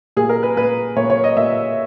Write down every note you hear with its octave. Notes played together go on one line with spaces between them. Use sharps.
A#2 G#4
A#4
B4
A#2 B4
A#2 C#5
C#5
D#5
A#2 E5